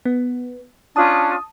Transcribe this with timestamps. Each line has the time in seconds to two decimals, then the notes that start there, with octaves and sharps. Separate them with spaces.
0.05 B3
0.96 C#4 D4 F4 A5 D#6